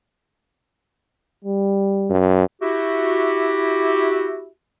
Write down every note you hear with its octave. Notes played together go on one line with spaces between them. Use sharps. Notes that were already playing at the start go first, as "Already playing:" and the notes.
G3
F#2
E4 F#4 G4